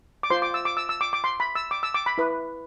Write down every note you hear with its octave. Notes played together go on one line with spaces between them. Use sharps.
D6
F4 C5 C6
D6
E6
D6
E6
E6
D6
D6
C6
B5
E6
D6
E6
D6
B5
E4 B4